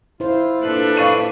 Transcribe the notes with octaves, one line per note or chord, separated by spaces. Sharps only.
E4 F4 C5
A#2 D4 A4 B4 F#6
F5 C#6 D#7